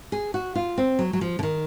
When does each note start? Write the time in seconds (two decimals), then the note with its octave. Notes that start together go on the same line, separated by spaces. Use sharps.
0.12 G#4
0.34 F#4
0.55 F4
0.78 C4
0.99 F#3
1.13 F#3
1.21 F3
1.39 D3
1.43 D#3